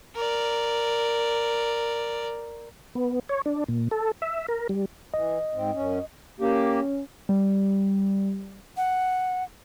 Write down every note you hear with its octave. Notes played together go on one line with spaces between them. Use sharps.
A#4 D5
B3
C#5
D4
A#2
A4
E5
A#4
G3
E3 D#5
G#2 C4
F#2 C#4
A#3 C#4 G4
G3
F#5